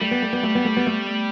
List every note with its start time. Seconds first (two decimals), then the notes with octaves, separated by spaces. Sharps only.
0.01 G3 A3
0.11 B3
0.22 A3
0.33 B3
0.43 A3
0.55 B3
0.65 A3
0.77 B3
0.87 A3